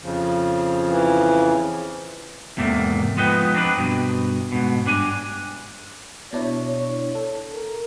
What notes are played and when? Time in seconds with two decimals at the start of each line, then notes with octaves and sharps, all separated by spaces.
0.01 F2 C#3 F3
0.84 E3
2.57 E2 G#2 C3 A3 A#3
3.17 F3 G#3 B3 D#4 B4 G5
3.54 C4 D4 D#4 B4
3.78 G2 B2
4.52 G#2 B2
4.86 G2 D4 G#5
6.33 B2 D4 E4 C#5
7.15 A4
7.53 A#4